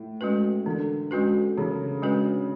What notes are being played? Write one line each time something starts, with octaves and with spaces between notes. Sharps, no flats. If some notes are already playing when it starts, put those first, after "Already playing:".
Already playing: A2
G#3 C#4 F#4 B4
D3 E3
G#3 C#4 F#4 B4
C#3 E3
G#3 C#4 F#4 B4